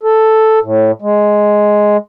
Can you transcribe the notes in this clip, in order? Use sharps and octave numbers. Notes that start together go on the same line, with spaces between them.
A4
A2
G#3